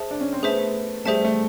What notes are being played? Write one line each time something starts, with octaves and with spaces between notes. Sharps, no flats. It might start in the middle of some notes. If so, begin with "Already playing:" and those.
Already playing: G#4 C5 E5 A5
D4
C#4
C4
A3 B3 G#4 C5 E5 A5
G3 A3 G#4 C5 E5 A5
A3